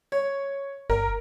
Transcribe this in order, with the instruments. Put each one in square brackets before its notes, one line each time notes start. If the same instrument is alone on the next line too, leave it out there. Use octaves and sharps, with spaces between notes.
[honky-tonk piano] C#5
[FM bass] G1 [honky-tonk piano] A#4